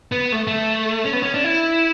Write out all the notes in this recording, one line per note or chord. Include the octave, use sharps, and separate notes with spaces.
B3
A3
A3
C#4
B3
C#4
D4
E4